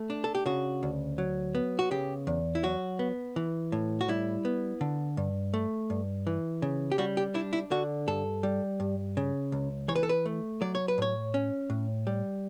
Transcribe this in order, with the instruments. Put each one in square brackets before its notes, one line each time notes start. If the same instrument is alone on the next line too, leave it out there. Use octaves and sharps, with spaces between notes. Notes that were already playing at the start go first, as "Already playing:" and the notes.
Already playing: [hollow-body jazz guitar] A3
D4
A4
G4
C#3 F#4
D2
F#3
B3
F#4
C#3 G4
E2
E4
F#3 F#4
B3
E3
A2
F#4
G3 E4
B3
D3
G2
A3
G2
E3
C#3
G4
G3 F#4
G4
D4 E4
E4
D3 F#4
G2 A4
G3
G2
C#3
C#2
E3 C#5
B4
A4
B4
A3
F#3 D5
C#5
B4
A2 C#5
C#4
A2
G3